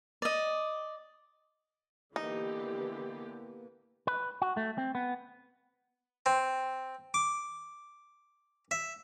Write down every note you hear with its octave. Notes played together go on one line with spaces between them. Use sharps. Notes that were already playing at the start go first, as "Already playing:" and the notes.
D5 D#5
D3 E3 A#3 B3 D#4 G4
B4
F#4
A3
C4
B3
C4
D6
E5